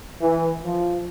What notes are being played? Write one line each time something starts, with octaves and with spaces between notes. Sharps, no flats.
E3
F3